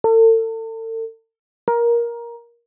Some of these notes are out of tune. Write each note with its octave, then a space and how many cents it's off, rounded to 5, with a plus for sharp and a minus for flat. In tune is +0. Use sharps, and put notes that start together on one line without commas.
A4 +40
A#4 +15